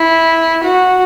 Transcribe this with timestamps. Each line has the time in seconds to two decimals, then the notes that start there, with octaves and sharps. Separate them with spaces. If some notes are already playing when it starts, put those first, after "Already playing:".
Already playing: E4
0.63 F#4